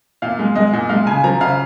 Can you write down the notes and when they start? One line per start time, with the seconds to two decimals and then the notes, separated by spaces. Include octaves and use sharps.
0.22 A#2 F5
0.39 G#3
0.55 G#3 D#5
0.73 A#2
0.89 G#3 F5
1.07 C#3 G#5
1.24 F3 A#5
1.40 C#3 F5